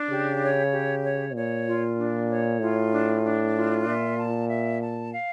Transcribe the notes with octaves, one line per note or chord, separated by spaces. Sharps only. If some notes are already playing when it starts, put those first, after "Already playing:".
Already playing: D4
C#3 G4
C#5
G4
C#5
A#2 C#5
F4
D4
C#5
A2 F4
D4
D4
F4
A#2 E5
A5
E5
A5
F5